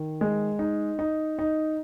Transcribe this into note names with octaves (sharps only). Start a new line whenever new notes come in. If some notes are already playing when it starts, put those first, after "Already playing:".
Already playing: D#3
G#3
D#4
D#4
D#4